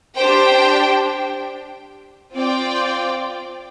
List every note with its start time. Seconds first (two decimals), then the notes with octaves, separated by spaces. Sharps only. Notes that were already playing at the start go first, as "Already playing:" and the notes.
0.16 D4 G4 C5 G5
2.34 C4 F4 D5 G5